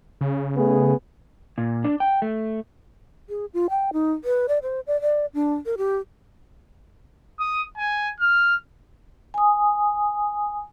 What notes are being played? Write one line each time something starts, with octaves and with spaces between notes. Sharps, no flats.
C#3
A3 B3 G#4
A#2
D4
G5
A3
G#4
F4
G5
D#4
B4
D5
C5
D5
D5
D4
A#4
G4
D#6
G#5
F6
G#5 D#6